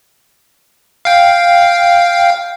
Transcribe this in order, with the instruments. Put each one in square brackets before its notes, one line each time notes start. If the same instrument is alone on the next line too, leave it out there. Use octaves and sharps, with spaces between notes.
[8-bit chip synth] F5 G5